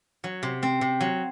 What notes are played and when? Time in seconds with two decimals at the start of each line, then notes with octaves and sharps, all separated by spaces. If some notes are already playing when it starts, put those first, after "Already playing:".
0.24 F#3
0.43 C3
0.63 C4
0.81 C3
1.01 F#3